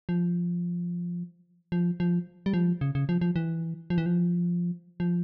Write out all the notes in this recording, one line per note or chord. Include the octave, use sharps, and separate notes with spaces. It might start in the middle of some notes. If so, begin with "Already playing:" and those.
F3
F3
F3
G3
F3
C#3
C#3
F3
F3
E3
F3
E3
F3
F3